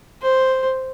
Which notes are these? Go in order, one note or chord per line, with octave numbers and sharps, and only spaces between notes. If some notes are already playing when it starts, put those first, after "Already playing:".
C5